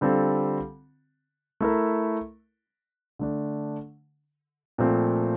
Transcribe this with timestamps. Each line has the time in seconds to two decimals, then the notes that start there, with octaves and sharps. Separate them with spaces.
0.01 D3 G3 C4 F4 A4
1.61 A3 E4 A#4
3.19 D3 A3 D4
4.78 A#2 F3 A3 C4